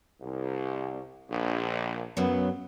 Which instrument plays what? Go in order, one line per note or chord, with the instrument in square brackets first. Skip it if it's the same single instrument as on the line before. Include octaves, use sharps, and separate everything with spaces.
[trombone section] C2
A#1
[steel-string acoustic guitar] F#2 C#3 F#3 [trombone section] B3